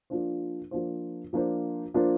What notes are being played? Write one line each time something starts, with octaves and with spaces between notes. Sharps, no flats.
F3 A#3 D4 F4 C5
F3 A#3 D4 F4 C5
F3 A#3 D4 F4 C5
F3 A#3 D4 F4 C5